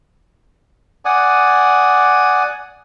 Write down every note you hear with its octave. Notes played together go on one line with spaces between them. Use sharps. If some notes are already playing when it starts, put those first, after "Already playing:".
D5 F#5 G#5 D#6